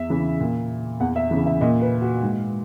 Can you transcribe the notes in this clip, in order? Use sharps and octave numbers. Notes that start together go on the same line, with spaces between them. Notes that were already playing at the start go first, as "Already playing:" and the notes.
Already playing: E2 E5
C#3 E3
A#2
E2 F#5
E5
C#3 E3
E5
A#2 D#5
B4
F#4
G#2